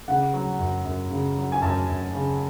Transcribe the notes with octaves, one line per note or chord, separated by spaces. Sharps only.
C#3 F#5
F#3
F#2
F#2
C#3
F#3
G#5
F#2 A5
F#2
C#3